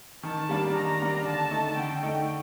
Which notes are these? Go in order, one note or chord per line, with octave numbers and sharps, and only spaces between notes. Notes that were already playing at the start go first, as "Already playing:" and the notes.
D#3 A5
G3 A#3 D4
D#3 A#5
G3 A#3 D4
D3 A5
A3 D#4
D3 G5
A3 D#4